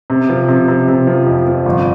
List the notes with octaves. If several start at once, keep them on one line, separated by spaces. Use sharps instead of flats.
C3
F3
C3
C3
C3
F3
F2
F3
G1